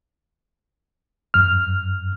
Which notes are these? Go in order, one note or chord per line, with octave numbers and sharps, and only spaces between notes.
F#2 F6